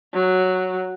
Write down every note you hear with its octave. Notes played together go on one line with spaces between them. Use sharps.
F#3